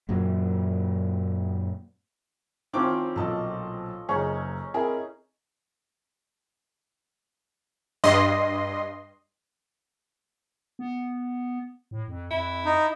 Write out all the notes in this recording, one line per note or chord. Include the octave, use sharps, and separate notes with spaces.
F#2 A#2 F#3
D#3 F3 C4 C#4 E4 D6
B1 A#2 A4 D#5 A5
F#1 C#4 D#4 G#4 C#5
C4 E4 G#4 A#4
G2 D#5 C6
B3
A2
F2
F2 E4
D#4